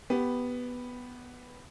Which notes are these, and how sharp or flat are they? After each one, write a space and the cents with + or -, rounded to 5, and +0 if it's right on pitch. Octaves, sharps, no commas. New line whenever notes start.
B3 +0 G4 +0